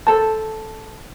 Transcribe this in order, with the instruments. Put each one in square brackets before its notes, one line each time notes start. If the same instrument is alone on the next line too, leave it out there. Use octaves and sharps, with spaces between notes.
[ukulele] A4 C5 [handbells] A5